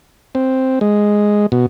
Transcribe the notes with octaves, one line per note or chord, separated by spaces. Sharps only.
C4
G#3
B2